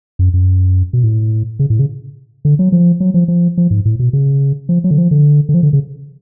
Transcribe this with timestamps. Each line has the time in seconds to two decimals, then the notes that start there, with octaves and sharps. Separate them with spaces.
0.19 F#2
0.34 F#2
0.93 B2
1.03 A2
1.59 C#3
1.70 A2
1.79 C#3
2.45 D3
2.59 F#3
2.72 F3
3.00 F#3
3.14 F3
3.28 F3
3.58 F3
3.71 G#2
3.85 A2
3.99 B2
4.13 C#3
4.69 F3
4.84 F#3
4.90 D3
4.98 F3
5.11 D3
5.49 D3
5.54 F3
5.63 D3
5.73 C#3